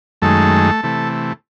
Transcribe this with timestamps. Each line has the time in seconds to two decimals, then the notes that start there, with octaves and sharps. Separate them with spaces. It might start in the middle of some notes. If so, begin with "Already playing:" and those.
0.22 F#2 D#3 G#3 A3 A4
0.83 C3 E3 A3